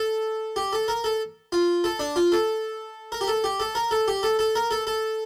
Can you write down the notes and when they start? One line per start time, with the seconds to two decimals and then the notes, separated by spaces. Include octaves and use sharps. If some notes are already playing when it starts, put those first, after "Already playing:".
Already playing: A4
0.56 G4
0.73 A4
0.88 A#4
1.04 A4
1.52 F4
1.84 A4
1.99 D4
2.16 F4
2.32 A4
3.12 A#4
3.21 G4
3.28 A4
3.44 G4
3.60 A4
3.75 A#4
3.91 A4
4.08 G4
4.23 A4
4.39 A4
4.55 A#4
4.71 A4
4.87 A4